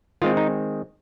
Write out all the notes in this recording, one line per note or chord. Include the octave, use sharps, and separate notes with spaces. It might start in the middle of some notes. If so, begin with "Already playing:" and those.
D#3 G#3 C4 F4
D#4